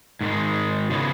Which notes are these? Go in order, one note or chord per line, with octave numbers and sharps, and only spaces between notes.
G#2 D#3 G#3
C#3 G#3 B3